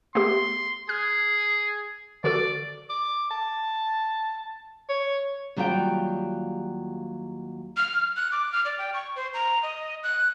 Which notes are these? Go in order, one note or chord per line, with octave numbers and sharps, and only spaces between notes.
A3 B3 G4 C6
G#4 F6
D3 F#4 A4 D5
D6
A5
C#5
D#2 F#3 G3 F4 F#5 G5
F6
F#6
D6
F6
D5
G5
C#6
C5
A#5
D#5
F#6